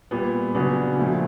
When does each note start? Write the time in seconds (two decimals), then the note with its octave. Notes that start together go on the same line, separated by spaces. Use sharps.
0.11 A#2 G3 B3
0.55 C#3 F#3 B3 D4 F#4
0.98 A#2 F3 A3